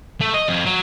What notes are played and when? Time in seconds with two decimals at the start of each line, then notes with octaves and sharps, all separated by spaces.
0.21 A3
0.34 D#5
0.49 F2
0.66 F#3